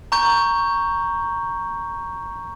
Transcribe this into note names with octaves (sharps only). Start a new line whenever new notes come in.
A#5 C#6 G6